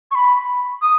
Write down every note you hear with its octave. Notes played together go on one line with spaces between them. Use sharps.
C#6
B5
D#6